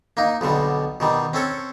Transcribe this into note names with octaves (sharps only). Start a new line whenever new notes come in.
A#3 D#4
B1 B2 D3 G3
B2 D#3 G3
C4 C#4 A4 C#5